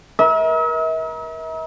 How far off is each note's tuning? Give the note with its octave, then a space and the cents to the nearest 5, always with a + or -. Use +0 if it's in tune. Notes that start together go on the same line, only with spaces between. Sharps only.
A#4 +35 E5 -45